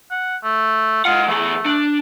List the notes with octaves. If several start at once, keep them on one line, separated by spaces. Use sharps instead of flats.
F#5
A3
G#3 F4 F#5
E3 A3 G#4
D4